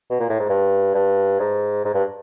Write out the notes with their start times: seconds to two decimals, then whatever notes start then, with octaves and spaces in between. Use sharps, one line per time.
0.10 B2
0.20 A#2
0.29 A2
0.39 G#2
0.49 G2
0.94 G2
1.40 G#2
1.85 G#2
1.94 G2